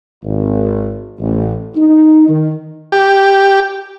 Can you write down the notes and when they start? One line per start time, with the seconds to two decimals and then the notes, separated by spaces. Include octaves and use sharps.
0.23 G#1
1.19 A1
1.76 D#4
2.28 D#3
2.92 G4